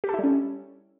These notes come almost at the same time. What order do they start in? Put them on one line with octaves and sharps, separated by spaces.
G4 A4 E4 G3 C#4